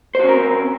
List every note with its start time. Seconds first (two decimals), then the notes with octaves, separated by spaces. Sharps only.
0.15 C5
0.19 F#4
0.24 C#4
0.29 A#4
0.33 C4